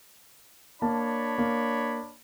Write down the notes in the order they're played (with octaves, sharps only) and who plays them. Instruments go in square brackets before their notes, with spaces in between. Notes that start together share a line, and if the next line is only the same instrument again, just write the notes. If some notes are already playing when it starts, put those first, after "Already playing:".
[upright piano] A#3 A5 [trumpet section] D4 C#5 B5
[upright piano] A#3